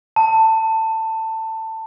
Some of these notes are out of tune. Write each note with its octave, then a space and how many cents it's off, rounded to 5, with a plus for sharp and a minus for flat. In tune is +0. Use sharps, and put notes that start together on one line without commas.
A5 +20